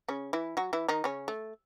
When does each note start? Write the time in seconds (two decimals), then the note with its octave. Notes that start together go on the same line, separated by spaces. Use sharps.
0.08 C#3 C#4
0.33 E3 E4
0.57 F#3 F#4
0.73 E3 E4
0.89 D#3 D#4
1.04 C#3 C#4
1.28 A3